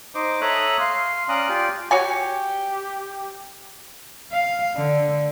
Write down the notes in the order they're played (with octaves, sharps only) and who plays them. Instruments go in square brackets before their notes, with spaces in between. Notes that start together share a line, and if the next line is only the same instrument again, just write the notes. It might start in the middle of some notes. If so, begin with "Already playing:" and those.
[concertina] D#4 C5 D#5 D6
A4 C#5 E5 A#5 D#6 F#6
F5 C6
C#4 D5 F5 A#5 D#6 F#6
F4 G4 D5 F5
[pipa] F#4 C#5 G#5 [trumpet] G4
[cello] F5
D3